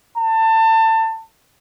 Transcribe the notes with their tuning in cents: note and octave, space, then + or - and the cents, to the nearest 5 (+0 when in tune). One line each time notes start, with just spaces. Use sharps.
A5 +25